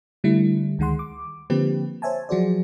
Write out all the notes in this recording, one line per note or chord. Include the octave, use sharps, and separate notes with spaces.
D3 G3 A3 E4
D2 D#3 G#3 F#5 C6
D6
D3 F3 A#3 C4 G4 B4
C5 C#5 E5 G#5 A5
F3 F#3 F#4 G#4 C5 D5